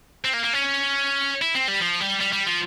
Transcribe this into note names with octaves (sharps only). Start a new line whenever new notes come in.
C4
A#3
A#3
C#4
E4
C4
G3
F3
G3
G3
G3
F3